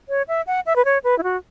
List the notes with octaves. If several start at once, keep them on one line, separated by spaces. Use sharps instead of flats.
C#5
E5
F#5
E5
B4
C#5
B4
E4
F#4